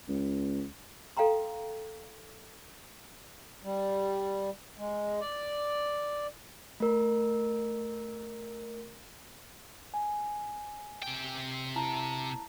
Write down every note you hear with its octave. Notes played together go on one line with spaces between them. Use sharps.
C#2
A4 F5 G5 A#5 C6
G3
G#3
D5
A3 A#4
G#5
C3 G5
E4 A5 A#5